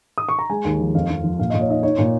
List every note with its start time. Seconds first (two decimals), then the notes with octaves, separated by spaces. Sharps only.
0.18 D#6
0.29 C#6
0.39 A#5
0.49 G#3 G#5
0.65 D#2
0.80 F3
0.95 F2 F5
1.10 F2
1.24 F3
1.39 A#2 F5
1.50 A#2 D#5
1.60 C#5
1.69 D#4 D#5
1.83 D#4 C#5
1.98 A#2